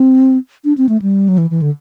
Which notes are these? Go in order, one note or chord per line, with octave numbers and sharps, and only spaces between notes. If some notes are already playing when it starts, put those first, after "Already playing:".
Already playing: C4
D4
C4
A3
G3
F#3
E3
E3
D3